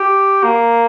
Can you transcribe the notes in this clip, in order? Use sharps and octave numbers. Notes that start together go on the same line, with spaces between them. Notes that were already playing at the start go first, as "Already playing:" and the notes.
Already playing: G4
A#3